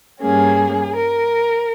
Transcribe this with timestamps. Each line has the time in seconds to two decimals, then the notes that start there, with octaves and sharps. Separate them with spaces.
0.21 G2 G3 A#3 C#4 G#4
0.94 A#4